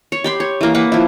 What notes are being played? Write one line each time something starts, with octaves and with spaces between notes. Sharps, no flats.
C#5
G4 B5 C6
C#5
E3 A#3
A#3 B4 F#5
F3 E4